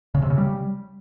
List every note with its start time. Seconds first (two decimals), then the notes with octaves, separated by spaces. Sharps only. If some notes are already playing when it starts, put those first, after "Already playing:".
0.15 C#3
0.22 C3
0.30 C#3
0.38 G3